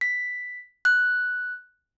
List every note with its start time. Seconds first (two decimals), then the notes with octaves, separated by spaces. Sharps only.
0.01 B6
0.85 F#6